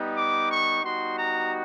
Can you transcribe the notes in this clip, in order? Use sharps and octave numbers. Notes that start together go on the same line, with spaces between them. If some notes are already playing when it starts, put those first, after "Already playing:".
Already playing: G3 B3 D#4
D6
C#6
G3 B3 D#4 F#4 C6
A#5